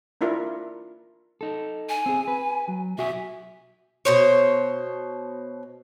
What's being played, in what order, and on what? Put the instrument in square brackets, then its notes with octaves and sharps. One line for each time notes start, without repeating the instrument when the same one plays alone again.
[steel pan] A#3 D4 E4 F4 A#4
[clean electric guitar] D#4 A4
[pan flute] G#5
[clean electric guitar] C4 G#4
B4
F#3
[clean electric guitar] B1 F#4 G#5 [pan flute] E5
[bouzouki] B2 C5 C#5